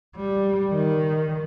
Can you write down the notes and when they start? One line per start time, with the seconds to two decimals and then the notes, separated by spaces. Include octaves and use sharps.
0.17 G3
0.73 D#3